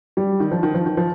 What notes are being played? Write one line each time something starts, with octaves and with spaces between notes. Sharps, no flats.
G3
D#3
F3
D#3
F3
D#3
F3